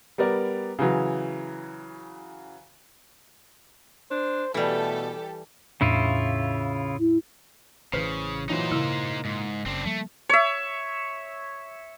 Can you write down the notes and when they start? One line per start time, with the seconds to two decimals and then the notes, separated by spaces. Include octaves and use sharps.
0.18 G3 B3 A#4 D5
0.79 C#3 E3 F#3
4.11 D4 C5
4.54 B2 E3 G3 A3 G4 A4
5.81 E2 A2 C#3 D4 E4 F4
6.99 E4
7.93 A1 C#3 E3 B4 C5 F6
8.49 A#2 E3 F#3 D#4 C5
8.71 A#2 C#3 A#3 E4 F6
9.25 G#2
9.66 F#1 C#3 C4 D4
9.86 F3 G3 A3 A#3
10.29 C#5 E5